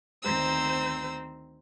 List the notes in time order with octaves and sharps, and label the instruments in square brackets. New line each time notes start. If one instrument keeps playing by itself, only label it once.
[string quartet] D2 D#3 C4 C5 A#5 E6